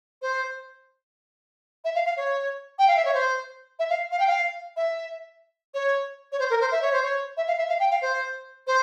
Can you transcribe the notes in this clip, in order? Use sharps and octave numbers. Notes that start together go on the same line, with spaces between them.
C5
E5
F5
F5
C#5
G5
F5
E5
C#5
C5
E5
F5
F5
G5
F5
E5
C#5
C#5
C5
A#4
C5
E5
C#5
C5
C#5
E5
F5
E5
F5
G5
F5
C5
C5